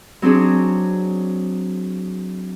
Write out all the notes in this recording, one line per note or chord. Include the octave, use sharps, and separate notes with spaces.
F#3 C4 D4 G#4